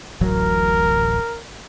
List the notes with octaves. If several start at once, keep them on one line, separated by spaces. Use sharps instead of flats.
D1 A1 F#3 A#4